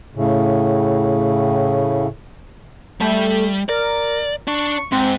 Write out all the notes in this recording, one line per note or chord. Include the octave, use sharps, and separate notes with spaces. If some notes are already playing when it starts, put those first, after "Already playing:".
A2 C#3
G3 A3
A#4 D5
D4 C#6
G#2 C4